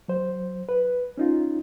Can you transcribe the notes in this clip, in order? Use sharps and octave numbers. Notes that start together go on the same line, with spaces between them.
F#3 C5
B4
C#4 D#4 F4